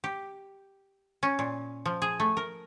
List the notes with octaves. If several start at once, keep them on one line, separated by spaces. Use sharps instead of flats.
G4
C#4
A#2
F3
G#4
A3
A#4